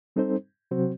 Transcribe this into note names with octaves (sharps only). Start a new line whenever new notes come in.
G3 C4 D#4 A4 C5
C3 F#3 C4 F#4 C5